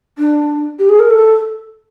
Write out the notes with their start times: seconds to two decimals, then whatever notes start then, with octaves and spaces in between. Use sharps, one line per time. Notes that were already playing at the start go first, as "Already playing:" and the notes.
0.19 D4
0.79 G4
0.89 G#4
1.00 A#4
1.10 A4